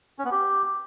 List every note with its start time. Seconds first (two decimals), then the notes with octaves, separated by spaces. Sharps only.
0.19 C#4
0.25 B3
0.31 G4